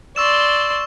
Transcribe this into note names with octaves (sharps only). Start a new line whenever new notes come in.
D5 C6 C#6 E6 E7